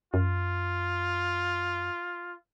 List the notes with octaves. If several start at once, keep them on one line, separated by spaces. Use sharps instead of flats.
F#2 F4